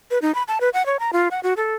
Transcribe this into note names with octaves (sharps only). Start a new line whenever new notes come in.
B4
D#4
B5
A5
B4
F#5
C#5
A#5
F4
F#5
F#4
A4